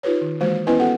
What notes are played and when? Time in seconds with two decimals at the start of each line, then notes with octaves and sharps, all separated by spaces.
0.03 D#4 F4 G4 B4 C#5
0.21 D#3
0.41 E3 G#3 A#3 F#4 C5
0.67 B3 C#4 E4 B4 D#5 G#5
0.80 B3 F#4 G4 A4 F#5